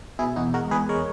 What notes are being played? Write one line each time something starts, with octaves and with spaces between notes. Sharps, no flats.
B2 E4 G#4
E2 D#4 F#4
G#3 F#4 A#4
E2 G#4 B4
G#3 A#4 C#5